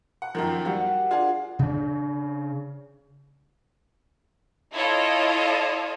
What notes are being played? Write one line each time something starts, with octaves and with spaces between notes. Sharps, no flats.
F#5
F#2 D#3 F3 A#4 G5
G3 F#4 F5 F#5
D4 F4 G#4
C#3 D4
E4 F4 A4 C#5 D#5